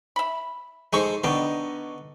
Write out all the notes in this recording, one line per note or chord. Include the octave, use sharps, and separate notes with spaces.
E5 B5
G#3 D#4 A4 C5 C#6
D3 D#3 B3 D4 D#4 D#5 C#6